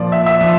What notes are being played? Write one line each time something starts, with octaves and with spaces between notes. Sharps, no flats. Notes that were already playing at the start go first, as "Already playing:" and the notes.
Already playing: A#2 F3 D5
E5
E5
F3